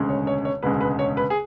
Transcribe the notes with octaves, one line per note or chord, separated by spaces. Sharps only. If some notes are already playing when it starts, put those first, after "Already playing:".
Already playing: E1 D2 C#3 G#3
C#5
C#5
C#5
E1 D2 C#3 G#3 B4
B4
C#5
B4
G#4